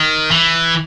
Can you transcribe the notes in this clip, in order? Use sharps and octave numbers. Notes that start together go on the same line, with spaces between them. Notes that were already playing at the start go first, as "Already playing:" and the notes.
Already playing: D#3
E3